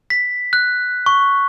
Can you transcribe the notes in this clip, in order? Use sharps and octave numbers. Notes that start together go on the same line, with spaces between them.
B6
F#6
C#6